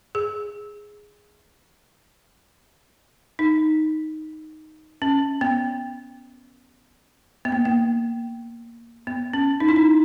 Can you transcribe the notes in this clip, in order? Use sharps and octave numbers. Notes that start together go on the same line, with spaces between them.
G#4
D#4
C#4
B3
B3
A#3
A#3
B3
C#4
D#4
E4
D#4